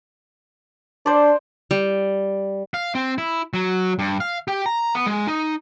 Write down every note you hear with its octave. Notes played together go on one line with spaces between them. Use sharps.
D4 C5 D5
G3
F5
C4
E4
F#3
G2
F5
G4
A#5
B3
G#3
D#4